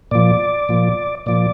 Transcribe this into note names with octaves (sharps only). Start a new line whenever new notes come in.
A#2 F3 D5
A#2 F3
A#2 F3 D5